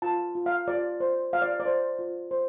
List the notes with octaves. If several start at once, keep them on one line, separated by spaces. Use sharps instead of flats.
F4 A5
F4
F5
F4 D5
C5
F4 F5
D5
D5
C5
F4
C5